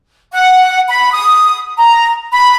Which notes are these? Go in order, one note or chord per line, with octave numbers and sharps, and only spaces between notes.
F#5
B5
D#6
A#5
B5